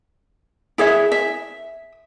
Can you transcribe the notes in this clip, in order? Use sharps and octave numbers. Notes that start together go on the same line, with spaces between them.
E4 G#4 C#5 E5
E5